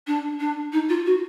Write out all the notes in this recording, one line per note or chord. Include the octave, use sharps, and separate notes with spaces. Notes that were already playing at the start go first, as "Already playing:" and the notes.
D4
D4
D#4
F4
F#4